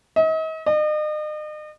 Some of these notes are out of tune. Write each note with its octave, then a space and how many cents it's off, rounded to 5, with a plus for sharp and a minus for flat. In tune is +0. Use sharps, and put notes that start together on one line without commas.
D#5 +40
D#5 -40